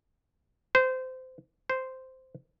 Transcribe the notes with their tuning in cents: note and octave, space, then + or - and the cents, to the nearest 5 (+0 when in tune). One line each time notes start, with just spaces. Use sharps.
C5 -25
C5 -10